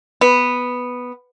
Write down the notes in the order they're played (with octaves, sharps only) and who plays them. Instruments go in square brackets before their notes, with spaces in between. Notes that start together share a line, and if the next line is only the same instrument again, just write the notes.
[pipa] B3